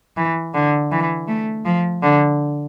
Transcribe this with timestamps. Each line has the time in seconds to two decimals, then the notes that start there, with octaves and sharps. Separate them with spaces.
0.17 E3
0.54 D3
0.91 E3
1.28 A3
1.65 F3
2.03 D3